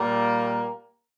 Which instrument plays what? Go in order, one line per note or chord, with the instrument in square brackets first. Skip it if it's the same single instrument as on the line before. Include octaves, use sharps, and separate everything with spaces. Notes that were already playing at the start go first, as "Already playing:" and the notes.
Already playing: [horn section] A#2 G3 A#3